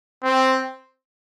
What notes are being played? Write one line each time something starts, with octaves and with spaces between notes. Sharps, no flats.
C4